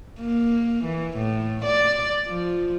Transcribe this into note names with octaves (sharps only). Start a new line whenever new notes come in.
A#3
E3
A2
D5
F3